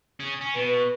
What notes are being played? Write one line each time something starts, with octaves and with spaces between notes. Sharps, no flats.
C#4 G#4
C#4
B2 B4